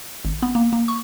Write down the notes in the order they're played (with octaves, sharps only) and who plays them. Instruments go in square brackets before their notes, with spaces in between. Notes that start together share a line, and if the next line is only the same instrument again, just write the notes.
[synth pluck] G#1
B3
A#3
A#3
C#6